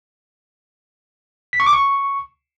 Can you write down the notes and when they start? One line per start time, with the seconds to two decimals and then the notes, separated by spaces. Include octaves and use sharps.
1.53 B6
1.60 C#6
1.66 D6
1.73 C#6